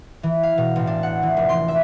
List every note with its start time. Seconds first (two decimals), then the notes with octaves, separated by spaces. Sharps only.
0.23 E3
0.43 F5
0.58 B2
0.76 A1
0.87 D4
1.03 F#5
1.23 E3
1.37 F1
1.49 C6
1.68 E5